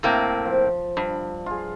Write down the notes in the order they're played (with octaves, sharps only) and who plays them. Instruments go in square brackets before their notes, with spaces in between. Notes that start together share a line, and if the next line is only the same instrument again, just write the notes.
[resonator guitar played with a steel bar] A2 A#3 C4
[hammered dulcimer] F3
[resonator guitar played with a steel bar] G2 [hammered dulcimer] B5
[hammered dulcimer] F4 G#4